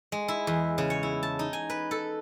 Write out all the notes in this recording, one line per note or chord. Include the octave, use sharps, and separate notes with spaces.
G#3
E4
E2
C#3
C#5
E4
A5
D#4
G#5
B4
A4